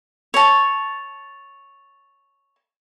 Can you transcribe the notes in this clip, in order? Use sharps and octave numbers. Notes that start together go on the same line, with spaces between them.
C#5 A5